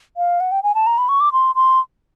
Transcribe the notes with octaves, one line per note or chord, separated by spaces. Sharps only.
F5
F#5
G5
G#5
A5
A#5
B5
C#6
D6
C6
C6